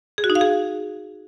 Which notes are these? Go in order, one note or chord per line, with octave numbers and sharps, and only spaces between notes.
G#4
F#4
D#4
F5
G#4